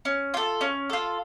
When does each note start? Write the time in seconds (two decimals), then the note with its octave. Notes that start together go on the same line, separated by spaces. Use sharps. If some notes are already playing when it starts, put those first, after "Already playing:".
0.05 C#4
0.34 F4 A4
0.61 C#4
0.90 F4 A4